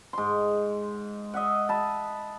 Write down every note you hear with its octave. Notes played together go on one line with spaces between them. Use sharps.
G#2 C6
D#5 E5 F#5
A5 B5